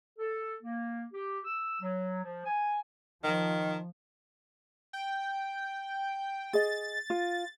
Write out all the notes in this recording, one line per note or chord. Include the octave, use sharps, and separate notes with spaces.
A4
A#3
G4
E6
F#3
F3
G#5
D#3 F3
G5
G#4 D#5 A6
F4